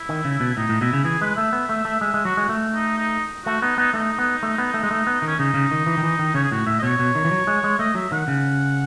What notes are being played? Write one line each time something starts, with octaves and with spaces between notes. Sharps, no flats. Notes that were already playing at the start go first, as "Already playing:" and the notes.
Already playing: E4
D#3
C#3
B2
A2 D#4
A2
B2 E4
C#3
E3 G#4
G#3 B4
A3 E5
B3
A3
A3
G#3 E5
G#3
F#3 F#4
G#3
A3
D#4
D#4
A3 F#4
B3 D#4
B3 D#4
A3 D#4
B3
A3
B3
A3
G#3
A3
B3
D#3
C#4
C#3 D#4
C#3
D#3
E3
D#3
E3
D#3
C#3 C#5
G#4
A2 F#4
A2 E5
D#5
B2 C#5
B2
D#3
E3
F#3
G#3
G#3
A3 D#5
F#3 E5
D#3 F#5
C#3